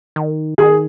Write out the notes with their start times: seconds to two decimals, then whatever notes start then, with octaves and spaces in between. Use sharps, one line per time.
0.16 D#3
0.58 D#3 G#4